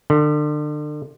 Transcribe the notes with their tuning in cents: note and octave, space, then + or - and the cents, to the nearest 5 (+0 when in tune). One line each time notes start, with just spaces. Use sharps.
D3 +35